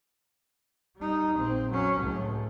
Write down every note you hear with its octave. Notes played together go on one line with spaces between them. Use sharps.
G3 D#4
A#1 C4
F#3 C#4
C#2 A2